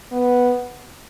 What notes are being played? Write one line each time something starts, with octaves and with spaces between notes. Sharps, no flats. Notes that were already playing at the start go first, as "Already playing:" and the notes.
B3